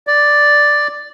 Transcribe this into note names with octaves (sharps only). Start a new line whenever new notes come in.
D5